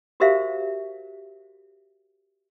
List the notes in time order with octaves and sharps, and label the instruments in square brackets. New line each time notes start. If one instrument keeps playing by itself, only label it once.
[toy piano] F#4 G4 A#4 C5 E5 F5